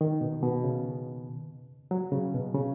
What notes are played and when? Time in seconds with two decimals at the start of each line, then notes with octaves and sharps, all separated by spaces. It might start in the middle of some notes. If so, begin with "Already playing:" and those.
0.01 D#3
0.21 B2
0.43 B2
0.64 C#3
1.91 F#3
2.12 C#3
2.34 B2
2.54 C#3